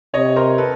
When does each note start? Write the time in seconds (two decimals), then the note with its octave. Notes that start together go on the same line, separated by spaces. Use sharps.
0.14 C3 C#5 D#5
0.36 A#4 C5
0.58 A4 B4